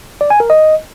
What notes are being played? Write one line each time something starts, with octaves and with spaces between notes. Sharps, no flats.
D5
G#5
A#4
D#5